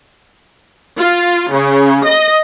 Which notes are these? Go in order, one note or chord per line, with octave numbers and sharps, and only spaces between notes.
F4
C#3
D#5